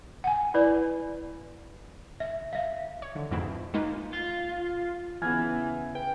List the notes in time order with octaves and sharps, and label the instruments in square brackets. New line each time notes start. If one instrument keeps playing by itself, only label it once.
[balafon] F#5 G#5
E4 B4 D5
E5
E5 F5
[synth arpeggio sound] C#5
D3
F2 G#2 B2 C4 E4
G#3 A#3 D#4 F4 B4
[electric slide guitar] F4
[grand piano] C#3 B3 F6 [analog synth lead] E3 [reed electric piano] G#5 G#6
[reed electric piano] B4 [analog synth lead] G5